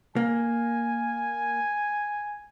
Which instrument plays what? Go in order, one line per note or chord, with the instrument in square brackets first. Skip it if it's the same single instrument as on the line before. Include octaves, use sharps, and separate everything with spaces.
[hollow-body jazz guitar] A#3 [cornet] G#5